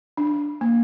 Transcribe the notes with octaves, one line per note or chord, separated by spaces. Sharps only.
D4
A#3